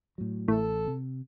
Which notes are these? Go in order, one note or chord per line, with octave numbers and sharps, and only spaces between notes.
A2 F#3
A1 A2 A4
C3